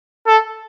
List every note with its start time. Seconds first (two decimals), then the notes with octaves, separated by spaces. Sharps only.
0.27 A4